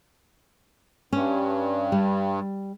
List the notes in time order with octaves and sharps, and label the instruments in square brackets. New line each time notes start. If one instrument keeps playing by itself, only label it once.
[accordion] G2 [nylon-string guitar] C#4
[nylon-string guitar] G3